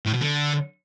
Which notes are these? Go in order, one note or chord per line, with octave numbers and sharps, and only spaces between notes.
A2
B2
D3